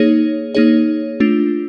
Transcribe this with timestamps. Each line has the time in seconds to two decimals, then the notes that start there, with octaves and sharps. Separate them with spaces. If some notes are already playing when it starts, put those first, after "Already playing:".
Already playing: A#3 D#4 G#4 C#5
0.55 A#3 D#4 G#4 C#5
1.20 A3 D4 F4